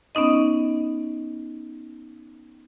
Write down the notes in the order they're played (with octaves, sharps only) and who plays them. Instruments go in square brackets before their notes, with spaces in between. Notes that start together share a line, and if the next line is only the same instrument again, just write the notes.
[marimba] B3 C#4 D#4 D#5